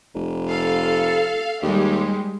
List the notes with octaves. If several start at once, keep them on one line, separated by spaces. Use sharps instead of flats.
F1
A4 F5
D#2 G3 G#3 G4